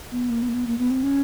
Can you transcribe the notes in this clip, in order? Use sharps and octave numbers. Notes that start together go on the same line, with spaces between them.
B3
A#3
B3
A#3
B3
A#3
B3
C4
C#4